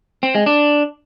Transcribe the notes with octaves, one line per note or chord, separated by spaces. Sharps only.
C4
G#3
D4